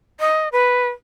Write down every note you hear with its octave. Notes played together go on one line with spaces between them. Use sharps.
D#5
B4